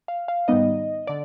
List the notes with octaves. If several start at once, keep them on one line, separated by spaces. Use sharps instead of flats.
F5
F5
G#2 D#3 G3 B3 D#4 D#5
D3 D5